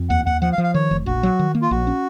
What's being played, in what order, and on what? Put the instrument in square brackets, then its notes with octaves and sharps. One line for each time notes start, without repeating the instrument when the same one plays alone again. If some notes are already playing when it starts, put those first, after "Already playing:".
Already playing: [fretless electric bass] F2
[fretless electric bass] D#2 [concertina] F#5
[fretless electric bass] D#2 [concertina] F#5
[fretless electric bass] F3 [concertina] F#5
[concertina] F5
[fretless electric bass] F3
[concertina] F5
[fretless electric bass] D#3 [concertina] C#5
[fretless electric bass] F1
[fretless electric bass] A#1 [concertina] F#4
[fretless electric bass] F#3
D#3
A#3
[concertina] F4
[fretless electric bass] A#1 [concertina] F#4
[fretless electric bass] C#4